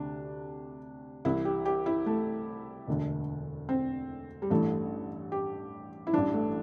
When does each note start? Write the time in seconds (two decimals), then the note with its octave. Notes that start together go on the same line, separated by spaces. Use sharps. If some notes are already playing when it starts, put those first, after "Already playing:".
Already playing: D2 C3 D4
1.25 C2 C3 E3 E4
1.45 G4
1.65 G4
1.86 E4
2.06 A3
2.87 E1 D2 D3
3.69 C4
4.42 G3
4.50 A1 G2 E3 A3
5.32 G4
6.07 E4
6.13 A1 G2 E3 D4
6.34 A3